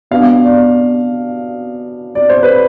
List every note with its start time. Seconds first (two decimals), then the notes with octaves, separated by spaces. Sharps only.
0.11 B2 B3 D4 F5
0.44 D5
2.15 D5
2.30 C5
2.43 B4